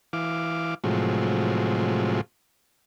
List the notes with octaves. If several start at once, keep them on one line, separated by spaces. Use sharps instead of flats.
E3 F5 D6
A2 C3 F3 F#3 G#3